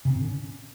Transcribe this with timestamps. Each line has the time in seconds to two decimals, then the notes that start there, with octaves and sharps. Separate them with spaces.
0.05 C3
0.10 C4
0.15 A2
0.20 D3
0.26 C#4